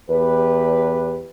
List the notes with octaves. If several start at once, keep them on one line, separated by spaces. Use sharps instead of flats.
E2 G4 B4